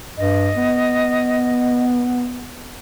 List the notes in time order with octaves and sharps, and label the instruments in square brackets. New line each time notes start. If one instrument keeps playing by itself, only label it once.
[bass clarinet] G2 [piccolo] D#5
[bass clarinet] B3